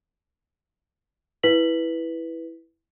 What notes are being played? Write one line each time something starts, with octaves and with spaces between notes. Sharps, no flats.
E4 B4 B6 F#7